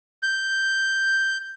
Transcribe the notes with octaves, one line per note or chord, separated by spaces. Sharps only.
G6